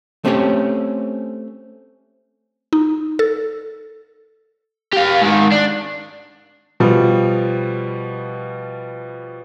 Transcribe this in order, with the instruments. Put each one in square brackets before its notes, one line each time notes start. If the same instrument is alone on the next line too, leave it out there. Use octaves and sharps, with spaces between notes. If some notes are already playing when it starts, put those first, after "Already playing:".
[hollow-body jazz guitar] A3 C4 C#4 G4 C#5
[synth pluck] D#4
A4
[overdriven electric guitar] G4 F5
G#2 D#3
D4
[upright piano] B2 F3 G3